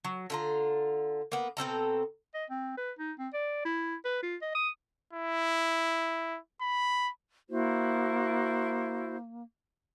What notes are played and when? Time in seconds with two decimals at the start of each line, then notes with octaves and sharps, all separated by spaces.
0.04 F#3
0.30 D3 F4 A#5
1.32 A#3 B3
1.57 B2 C4 A4 A#5
2.34 D#5
2.50 C4
2.77 B4
2.99 D#4
3.19 C4
3.33 D5
3.65 E4
4.05 B4
4.23 F4
4.42 D#5
4.55 D#6
5.13 E4
6.61 B5
7.50 A#3 E4 F#4 C5